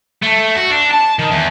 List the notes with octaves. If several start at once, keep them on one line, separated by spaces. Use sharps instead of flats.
A3
F#4
D4
A5
D#3
E2